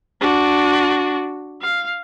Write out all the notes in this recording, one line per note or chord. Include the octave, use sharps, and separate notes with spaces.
D4 F#4
F5